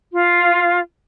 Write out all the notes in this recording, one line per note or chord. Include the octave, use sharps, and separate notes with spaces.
F4